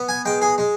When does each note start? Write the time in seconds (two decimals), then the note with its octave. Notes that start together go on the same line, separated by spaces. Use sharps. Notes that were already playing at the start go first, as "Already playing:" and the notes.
Already playing: B3
0.09 G#5
0.25 G#3 G5
0.42 G#4
0.58 G#3